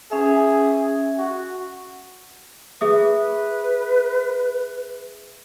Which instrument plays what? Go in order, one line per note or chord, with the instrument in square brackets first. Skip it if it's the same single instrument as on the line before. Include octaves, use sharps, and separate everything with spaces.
[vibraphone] C#4 E5 [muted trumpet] G#4
[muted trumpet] F#4
[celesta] G#4 E5 D#6 [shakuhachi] B4